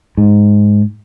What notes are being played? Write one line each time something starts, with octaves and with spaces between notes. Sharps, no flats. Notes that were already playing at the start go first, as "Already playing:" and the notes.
G#2